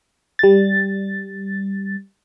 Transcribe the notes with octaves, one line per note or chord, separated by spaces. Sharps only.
G3 A6